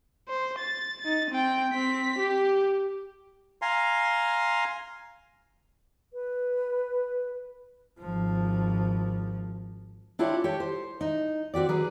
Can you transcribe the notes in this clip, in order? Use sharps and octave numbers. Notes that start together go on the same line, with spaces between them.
C5
A6
D#4 A6
C4 G5
C4 B6
G4
F5 G#5 A#5 C6
B4
G#1 F3
D4 E4 F4 G4 G#4 C#5
G4 C#5 A5
C5
D#4
C4 F#4 G4 D5
F#3 G#4 B4